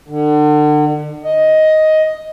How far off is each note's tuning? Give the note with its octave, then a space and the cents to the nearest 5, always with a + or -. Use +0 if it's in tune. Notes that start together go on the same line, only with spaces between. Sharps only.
D3 +35
D#5 +10